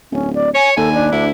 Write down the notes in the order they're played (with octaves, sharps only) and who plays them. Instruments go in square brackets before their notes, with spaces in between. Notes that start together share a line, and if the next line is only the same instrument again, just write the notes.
[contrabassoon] D1 [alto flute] C#4
[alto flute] D5
[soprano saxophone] C#5 [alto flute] G#5
[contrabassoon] D#2 [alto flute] A4 [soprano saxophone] G#5
[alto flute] D4
[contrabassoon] D2 [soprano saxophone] E4